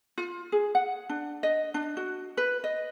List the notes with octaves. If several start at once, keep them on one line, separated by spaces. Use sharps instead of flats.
F4
G#4
F#5
D4
D#5
D4
F#4
B4
D#5